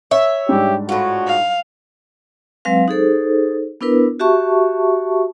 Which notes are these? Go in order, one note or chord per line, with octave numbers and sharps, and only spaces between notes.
C#5 E5
G#2 G3 D4 G4
A2 F4 F#4
F5
F#3 G#3 C4 B4 F5
D#4 G#4 A4 C5
B3 D4 E4 A#4 B4
F#4 G4 E5 A5 C#6